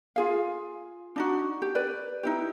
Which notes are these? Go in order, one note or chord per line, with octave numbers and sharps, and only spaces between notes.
F4 G#4 F5
D4 D#4 F#4
G4
B4 D5
D#4 E4 G4